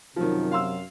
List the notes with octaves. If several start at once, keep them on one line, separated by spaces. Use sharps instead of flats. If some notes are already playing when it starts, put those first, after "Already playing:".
F#2 C3 D#3 F3 F#3
F5 C6 E6